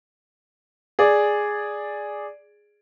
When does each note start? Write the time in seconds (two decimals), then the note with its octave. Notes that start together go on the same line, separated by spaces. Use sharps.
0.99 G#4 D5